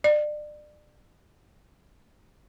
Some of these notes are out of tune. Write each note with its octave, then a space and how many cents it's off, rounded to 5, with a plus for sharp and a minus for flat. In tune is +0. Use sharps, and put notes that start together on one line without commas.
D5 +30